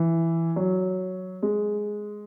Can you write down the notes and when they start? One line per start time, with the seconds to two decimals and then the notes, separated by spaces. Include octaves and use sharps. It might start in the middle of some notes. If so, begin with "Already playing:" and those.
Already playing: E3
0.56 F#3
1.42 G#3